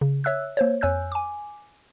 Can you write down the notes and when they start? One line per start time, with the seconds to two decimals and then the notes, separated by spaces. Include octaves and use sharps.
0.01 C#3
0.24 C#5 E5 E6 F#6
0.57 A#3 C5 C#5
0.81 F2 C#5 G#5 E6 F#6 G6
1.12 G#5 D6